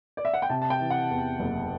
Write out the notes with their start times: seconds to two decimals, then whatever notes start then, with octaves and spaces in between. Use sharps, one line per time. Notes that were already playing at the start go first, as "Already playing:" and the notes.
0.17 D5
0.25 E5
0.34 F#5
0.42 G5
0.50 C3 A5
0.62 A5
0.70 G5
0.80 E3
0.90 F#5
1.10 E2
1.40 F#1